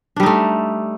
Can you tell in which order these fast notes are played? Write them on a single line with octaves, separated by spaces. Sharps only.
D4 G3 D#4 A3